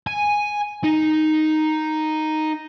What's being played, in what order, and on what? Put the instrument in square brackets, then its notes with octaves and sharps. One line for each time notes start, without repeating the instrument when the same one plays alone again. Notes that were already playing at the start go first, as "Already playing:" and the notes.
[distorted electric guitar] G#5
D#4